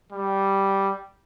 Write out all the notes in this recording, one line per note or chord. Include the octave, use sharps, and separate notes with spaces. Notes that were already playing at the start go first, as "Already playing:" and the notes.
G3